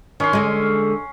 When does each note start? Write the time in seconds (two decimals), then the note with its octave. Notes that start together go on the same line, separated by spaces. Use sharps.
0.20 D#3 C#4 C6
0.33 D3 G#3